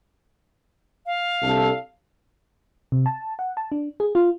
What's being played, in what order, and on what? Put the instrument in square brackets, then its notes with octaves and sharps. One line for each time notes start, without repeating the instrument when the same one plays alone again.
[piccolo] F5
[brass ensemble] C2 D4 A4
[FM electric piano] C3
A5
F#5
A5
D4
G#4
F4